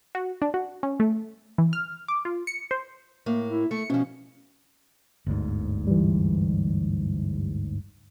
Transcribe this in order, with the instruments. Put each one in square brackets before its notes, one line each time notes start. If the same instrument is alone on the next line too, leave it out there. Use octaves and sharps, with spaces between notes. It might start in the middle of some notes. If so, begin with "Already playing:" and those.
[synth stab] F#4
D4
F#4
C#4
A3
E3
F6
D6
F4
C#7
C5
[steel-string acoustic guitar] A2 A#3
[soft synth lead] E4
[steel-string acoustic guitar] A3 [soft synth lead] C#7
[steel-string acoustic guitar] B2 F3 [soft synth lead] C#4
[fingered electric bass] G1 D2 G#2
[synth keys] E3 G3